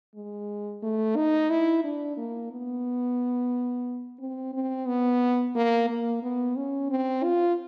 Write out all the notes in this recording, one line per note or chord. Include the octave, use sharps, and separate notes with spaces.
G#3
A3
D#4
E4
D4
A#3
B3
C4
C4
B3
A#3
A#3
B3
C#4
C4
F4